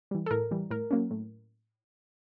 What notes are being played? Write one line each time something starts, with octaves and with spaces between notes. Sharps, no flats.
E3 G3
A4
A2 A#4
E3 G3
A2 A#4
F#3 A#3 C#4
A2